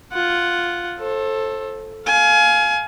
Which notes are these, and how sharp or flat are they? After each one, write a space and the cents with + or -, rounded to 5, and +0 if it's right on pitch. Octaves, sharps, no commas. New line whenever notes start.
F4 +0 F#5 +0
A4 +0 C5 +35
F5 +0 G#5 +30